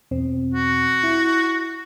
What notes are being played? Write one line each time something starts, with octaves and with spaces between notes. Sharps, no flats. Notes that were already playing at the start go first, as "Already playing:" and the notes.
E2 B2 C4
F#4
E4